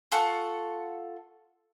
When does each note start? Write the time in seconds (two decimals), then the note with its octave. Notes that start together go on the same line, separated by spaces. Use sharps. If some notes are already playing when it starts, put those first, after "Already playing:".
0.12 F4 A4 F#5 C#6